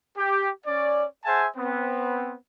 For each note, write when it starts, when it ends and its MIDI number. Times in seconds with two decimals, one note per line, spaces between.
0.17 0.49 67
0.66 1.05 61
0.66 1.05 74
1.25 1.46 68
1.25 1.46 72
1.25 1.46 76
1.25 1.46 78
1.25 1.46 80
1.25 1.46 81
1.56 2.34 59
1.56 2.34 60